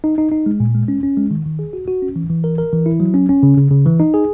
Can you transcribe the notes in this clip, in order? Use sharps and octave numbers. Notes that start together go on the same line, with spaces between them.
D#4
D#4
D#4
G#3
A#2
G#3
C#4
C#4
G#3
D#3
D#3
G#4
F#4
F#4
C#4
E3
E3
A#4
A#4
E3
E4
F#3
C#4
C#4
C#3
C#3
C#3
E3
D#4
G#4